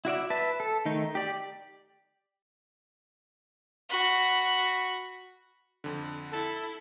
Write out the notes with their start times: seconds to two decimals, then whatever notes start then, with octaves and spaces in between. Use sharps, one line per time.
0.05 E4 F#4 D5 E5
0.30 B4 E5 A5
0.60 A4
0.85 D#3 A3 D#4
1.15 G4 D5
3.89 F#4 B5
5.84 F2 D3
6.33 E4 A4